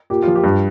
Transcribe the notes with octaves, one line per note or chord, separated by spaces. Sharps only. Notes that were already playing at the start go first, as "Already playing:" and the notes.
A#2 G4
F4
F3
G4
G2